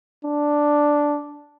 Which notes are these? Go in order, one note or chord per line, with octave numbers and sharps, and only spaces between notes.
D4